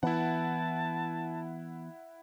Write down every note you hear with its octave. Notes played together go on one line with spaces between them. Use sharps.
E3 B3 E4 F#5 A5